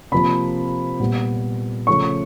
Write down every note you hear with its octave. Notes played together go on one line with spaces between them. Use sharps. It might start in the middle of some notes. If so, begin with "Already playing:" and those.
C3 F3 A#3 B5
A#2 G3 B3
C#3 F3 A3 C#4 C#6